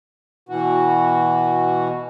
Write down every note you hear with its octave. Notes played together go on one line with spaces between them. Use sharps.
B2 E3 F#4